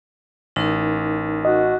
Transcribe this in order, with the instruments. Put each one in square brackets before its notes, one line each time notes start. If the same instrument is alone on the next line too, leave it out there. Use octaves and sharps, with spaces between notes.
[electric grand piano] A1 [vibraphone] D#4 A#4
[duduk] F#4 [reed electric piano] D#5